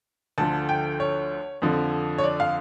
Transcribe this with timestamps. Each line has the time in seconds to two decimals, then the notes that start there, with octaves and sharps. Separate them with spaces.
0.38 D2 D3 F3 A5
0.69 G5
1.00 C#5
1.62 F2 D3 F3
2.18 C#5
2.24 D5
2.40 F5